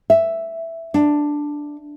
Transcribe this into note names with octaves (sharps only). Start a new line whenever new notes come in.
E5
D4